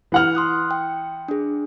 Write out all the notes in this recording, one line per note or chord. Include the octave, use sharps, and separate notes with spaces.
E3 F#5 F6
C6 D#6 F#6
G5
D4 G#4